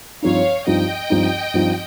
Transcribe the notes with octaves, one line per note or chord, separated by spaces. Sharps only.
G2 F3 C4 D#4 C#5 F5
G2 F3 C4 D#4 D#5 G5
G2 F3 C4 D#4
G2 F3 C4 D#4